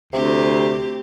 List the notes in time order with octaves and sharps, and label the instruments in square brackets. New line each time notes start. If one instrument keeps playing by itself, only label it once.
[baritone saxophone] D2 [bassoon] C3 [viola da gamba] C4 G4